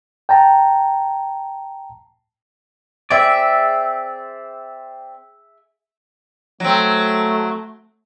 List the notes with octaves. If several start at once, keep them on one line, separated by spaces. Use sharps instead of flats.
G5 A5 A#5
C4 G#4 D5 E5
F#3 A3 C4